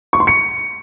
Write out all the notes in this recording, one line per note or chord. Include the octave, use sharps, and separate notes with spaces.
C#6
C6
C#7